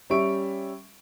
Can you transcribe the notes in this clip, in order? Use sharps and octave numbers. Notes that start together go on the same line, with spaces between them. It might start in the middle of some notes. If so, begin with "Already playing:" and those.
G3 C#4 G4 E5 C#6 D7